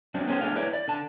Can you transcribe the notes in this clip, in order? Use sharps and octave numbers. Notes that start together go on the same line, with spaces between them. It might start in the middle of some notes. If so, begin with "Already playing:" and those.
F#2 F#3 C4 D4
B3 C#4 G#4 A4 C5
A3 D4 G#4 F5
E4 B4 C#5 D5
D5
D3 A5